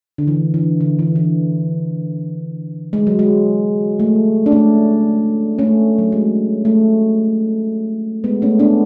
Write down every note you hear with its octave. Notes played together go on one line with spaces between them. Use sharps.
D3
E3
E3
D3
E3
E3
G#3
F#3
G#3
A3
D4
A3 C#4
A3 C#4
F#3
G#3
A3
G#3 B3
A3 C#4
B3 D4